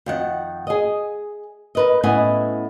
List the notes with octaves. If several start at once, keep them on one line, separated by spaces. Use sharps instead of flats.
F2 D#3 F#5
G#4 D#5
A#4 B4 D#5
A2 B3 C#4 E4 D#5 G#5